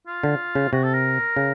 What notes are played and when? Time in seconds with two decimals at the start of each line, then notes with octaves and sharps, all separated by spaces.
0.07 F4
0.23 D3
0.55 C#3
0.72 C3 F#4
0.83 A4
0.94 A#4
1.37 C#3